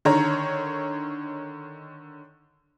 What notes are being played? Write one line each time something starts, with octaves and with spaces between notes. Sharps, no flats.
D3 D#3 C#5 A#5